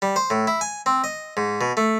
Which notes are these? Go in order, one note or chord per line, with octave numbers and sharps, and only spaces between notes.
G3
C5
A2
E4
G#5
C4
D#5
G#2
B2
A3